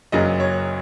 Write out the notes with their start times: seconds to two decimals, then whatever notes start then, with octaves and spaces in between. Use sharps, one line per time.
0.12 F#1 F#2 F#3 A#3 D#5
0.40 C#5